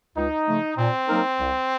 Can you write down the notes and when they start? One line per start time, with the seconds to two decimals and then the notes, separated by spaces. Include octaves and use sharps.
0.16 C#2 D#4
0.46 C#3 F3 A3
0.78 A#2 C4
1.08 F#3 A#3 D#4 A#4
1.39 C2